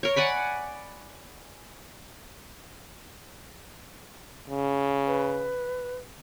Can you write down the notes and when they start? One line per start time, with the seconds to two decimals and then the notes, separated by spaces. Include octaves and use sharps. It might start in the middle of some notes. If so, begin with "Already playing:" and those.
0.03 A#4 C#5
0.16 D5 F#5 G#5 B5
4.50 C#3
5.07 B4